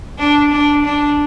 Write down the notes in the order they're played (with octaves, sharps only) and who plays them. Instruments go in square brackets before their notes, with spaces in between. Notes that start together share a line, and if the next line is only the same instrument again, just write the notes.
[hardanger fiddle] D4
D4
D4